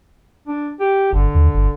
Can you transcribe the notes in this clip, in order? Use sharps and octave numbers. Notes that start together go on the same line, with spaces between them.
D4
G4
G1 D3
D#2
G1